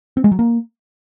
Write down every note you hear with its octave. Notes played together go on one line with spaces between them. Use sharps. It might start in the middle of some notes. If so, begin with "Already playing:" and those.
C4
G#3
F#3
A#3